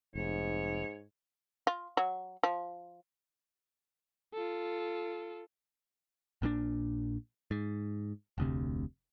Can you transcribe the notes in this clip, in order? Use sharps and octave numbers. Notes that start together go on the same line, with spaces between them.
F1 G#2 C#5
F4
F#3
F3
F4 A4
A#1 A#2 D#3 D4
G#2
F1 D2 C3